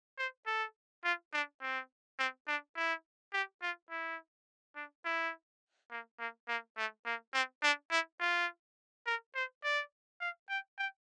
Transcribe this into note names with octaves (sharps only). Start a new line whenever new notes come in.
C5
A4
F4
D4
C4
C4
D4
E4
G4
F4
E4
D4
E4
A#3
A#3
A#3
A3
A#3
C4
D4
E4
F4
A#4
C5
D5
F5
G5
G5